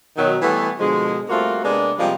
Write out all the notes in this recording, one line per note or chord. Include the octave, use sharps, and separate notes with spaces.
B2 D#3 F#3
E3 G3 A3 B3
B2 D3 F3 G#3
G3 A3 A#3 C4 F4 F#4
C3 G#3 A#3 B3 D4
C3 F3 G3 G#3 A#3